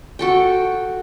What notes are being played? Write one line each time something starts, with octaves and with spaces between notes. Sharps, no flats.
F#4 A4 G5